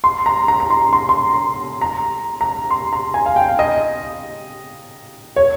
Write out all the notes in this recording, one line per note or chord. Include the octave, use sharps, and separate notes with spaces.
C6
A#5
A#5
A#5
C6
C6
C6
A#5
A#5
C6
A#5
G#5
F5
G5
D#5
C#5